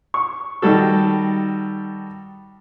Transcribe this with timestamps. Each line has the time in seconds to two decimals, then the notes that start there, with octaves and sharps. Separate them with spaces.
0.14 C#6
0.62 D#3 G3 F#4 A4